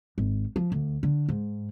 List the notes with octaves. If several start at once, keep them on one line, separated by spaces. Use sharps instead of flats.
G#1
F3
D2
D3
G#2